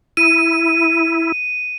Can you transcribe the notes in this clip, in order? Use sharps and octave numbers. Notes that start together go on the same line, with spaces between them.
E4 D#7